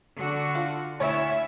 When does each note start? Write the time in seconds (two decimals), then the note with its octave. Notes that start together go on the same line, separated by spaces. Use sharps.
0.15 D3 F#4
0.55 F4
1.00 D2 E4 C#5 E5